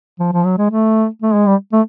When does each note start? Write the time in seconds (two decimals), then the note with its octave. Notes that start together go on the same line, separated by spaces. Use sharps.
0.20 F3
0.33 F3
0.45 F#3
0.58 G#3
0.71 A3
1.22 A3
1.34 G#3
1.47 G3
1.73 A3